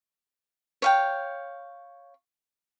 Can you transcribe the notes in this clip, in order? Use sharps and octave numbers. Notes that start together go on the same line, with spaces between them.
C#5 F5 G5